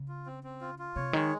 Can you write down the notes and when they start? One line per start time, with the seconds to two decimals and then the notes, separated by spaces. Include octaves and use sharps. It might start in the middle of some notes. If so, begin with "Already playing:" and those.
Already playing: C#3
0.08 F4
0.26 C4
0.43 C4
0.61 F4
0.79 F4
0.96 C3 C#5
1.13 D#3 G#3